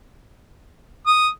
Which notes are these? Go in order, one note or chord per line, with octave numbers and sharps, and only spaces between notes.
D#6